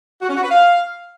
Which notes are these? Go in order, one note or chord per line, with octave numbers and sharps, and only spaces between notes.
F#4
C#4
F#4
B4
F5